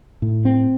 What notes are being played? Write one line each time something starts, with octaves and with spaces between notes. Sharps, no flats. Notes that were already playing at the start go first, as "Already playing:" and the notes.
A2
C4